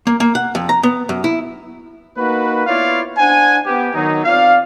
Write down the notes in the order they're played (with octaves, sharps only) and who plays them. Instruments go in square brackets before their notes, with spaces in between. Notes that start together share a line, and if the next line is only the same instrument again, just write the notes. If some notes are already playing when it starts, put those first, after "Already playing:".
[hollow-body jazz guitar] A#3
A#3
F#5
F2
A#5
B3
F#2
E4
[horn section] A#3 D#4 F#4 B4
B3 E4 F4 C#5 D5 F5
D4 C5 F#5 G#5
B3 G4
D#3 F#3 D#4
C4 F4 D5 F5